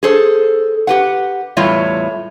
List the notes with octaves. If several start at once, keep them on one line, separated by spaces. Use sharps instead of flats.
G#4 A4 C5
G4 B4 F#5
E2 A2 G3 F4 C#5 E5